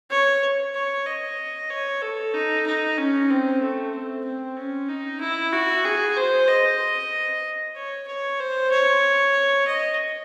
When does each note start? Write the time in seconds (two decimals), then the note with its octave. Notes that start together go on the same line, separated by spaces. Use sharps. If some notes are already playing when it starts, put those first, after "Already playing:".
0.10 C#5
0.74 C#5
1.06 D#5
1.70 C#5
2.02 A4
2.34 D#4
2.66 D#4
2.98 C#4
3.30 C4
3.62 A3
3.93 C4
4.25 C4
4.57 C#4
4.89 D#4
5.20 E4
5.53 F#4
5.85 G#4
6.16 C5
6.48 D#5
7.76 C#5
8.07 C#5
8.40 C5
8.71 C#5
9.67 D#5